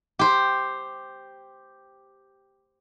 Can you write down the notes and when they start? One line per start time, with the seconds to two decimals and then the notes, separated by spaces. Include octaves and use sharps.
0.19 G4 C5